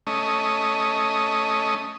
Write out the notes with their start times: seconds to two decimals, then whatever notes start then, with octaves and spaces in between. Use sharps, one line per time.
0.07 A3 C#4 D#5